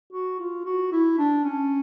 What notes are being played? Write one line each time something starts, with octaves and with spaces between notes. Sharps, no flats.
F#4
F4
F#4
E4
D4
C#4